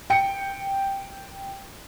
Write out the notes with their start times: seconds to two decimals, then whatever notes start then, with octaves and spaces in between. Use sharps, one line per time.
0.10 G5 C#7